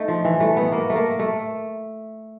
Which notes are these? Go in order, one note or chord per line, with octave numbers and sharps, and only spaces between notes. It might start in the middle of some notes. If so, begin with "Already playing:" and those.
Already playing: A3 D#4
F3
E3
A3
B3
A#3
A3
A#3
A3